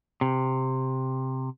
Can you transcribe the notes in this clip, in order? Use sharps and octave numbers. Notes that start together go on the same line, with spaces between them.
C3